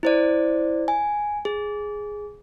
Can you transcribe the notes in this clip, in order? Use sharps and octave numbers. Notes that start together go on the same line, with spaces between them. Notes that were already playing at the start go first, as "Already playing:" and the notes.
E4 C5 D5
G#5
G#4